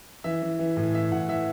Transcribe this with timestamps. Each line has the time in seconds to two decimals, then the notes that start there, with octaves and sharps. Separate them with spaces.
0.24 E3 E5
0.42 E3
0.59 E3
0.77 A2
0.94 E3 E5
1.12 A2 F#5
1.29 E3 E5